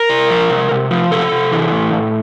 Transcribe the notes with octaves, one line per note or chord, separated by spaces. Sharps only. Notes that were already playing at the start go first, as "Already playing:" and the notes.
Already playing: A#4
C3
F3
C3
C3
F3
C3 A4
C3
E3
A2
A2